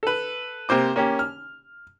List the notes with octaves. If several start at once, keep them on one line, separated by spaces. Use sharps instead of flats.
A4 B4
C3 A#3 C5 D6
A#3 C#4 G4
F6